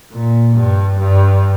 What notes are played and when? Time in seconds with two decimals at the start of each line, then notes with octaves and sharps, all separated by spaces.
0.13 A#2
0.56 G2
0.99 G2